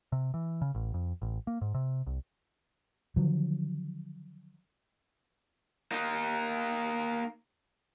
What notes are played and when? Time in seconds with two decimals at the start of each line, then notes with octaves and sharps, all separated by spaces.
0.12 C3
0.34 E3
0.61 C#3
0.75 A1
0.94 F2
1.22 A1
1.47 A#3
1.61 G#2
1.74 C3
2.07 C2
3.16 D3 D#3 F3 F#3
5.92 A#3 D#4